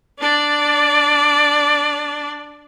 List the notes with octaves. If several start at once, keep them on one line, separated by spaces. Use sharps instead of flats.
D4 D5